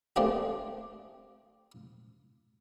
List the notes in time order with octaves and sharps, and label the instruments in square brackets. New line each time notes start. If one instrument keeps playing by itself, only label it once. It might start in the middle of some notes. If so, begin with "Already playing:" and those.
[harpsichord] A3 A#3 C4 D4 G4 G#4